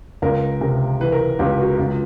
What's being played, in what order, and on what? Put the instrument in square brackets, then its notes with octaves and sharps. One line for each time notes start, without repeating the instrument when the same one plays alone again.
[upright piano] C#2 [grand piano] A#4
[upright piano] C3 [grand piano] A#4
[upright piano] E3 [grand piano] B4
[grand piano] A#4
B4
[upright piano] C#2 [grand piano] G4
[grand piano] F#4
[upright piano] C#2 [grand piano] F4